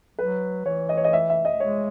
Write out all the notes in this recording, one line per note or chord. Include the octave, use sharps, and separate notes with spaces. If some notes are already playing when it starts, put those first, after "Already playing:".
F#3 B4
E3 C#5
D#5
C#5
D#5
E5
E5
D#5
G#3 C#5